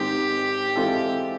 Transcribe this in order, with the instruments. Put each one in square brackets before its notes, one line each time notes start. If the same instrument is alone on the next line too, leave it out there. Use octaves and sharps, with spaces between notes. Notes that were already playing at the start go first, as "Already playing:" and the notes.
Already playing: [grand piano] G#2 D#3 G#3 C4 [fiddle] G4
[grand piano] E3 G#3 C4 F4 A4